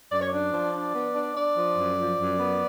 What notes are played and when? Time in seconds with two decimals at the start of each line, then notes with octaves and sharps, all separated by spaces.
0.12 F#2 D5
0.20 C#5
0.29 D4 D5
0.53 F3
0.74 D4
0.94 B3
1.15 D4
1.35 D4 D5
1.56 F3
1.77 F#2
1.98 F3
2.18 F#2
2.39 B3